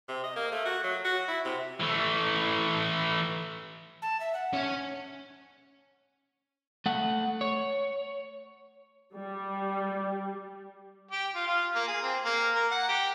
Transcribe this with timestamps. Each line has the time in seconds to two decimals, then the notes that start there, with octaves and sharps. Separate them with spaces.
0.08 C3
0.23 D#5
0.36 A#3
0.52 A3
0.65 F#4
0.83 F#3
1.05 F#4
1.28 E4
1.45 C3
1.80 E3 A3
4.02 A5
4.20 E5
4.33 F#5
4.53 C#4 C#5
6.86 A3 F#5
7.41 C#5
9.15 G3
11.11 G4
11.35 F4
11.47 F4
11.75 A#3
11.87 G#4
12.02 C4
12.25 A#3
12.55 A#4
12.71 F#5
12.88 G4